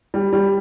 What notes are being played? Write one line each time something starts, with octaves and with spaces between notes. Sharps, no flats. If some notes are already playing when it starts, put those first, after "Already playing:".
G3
G3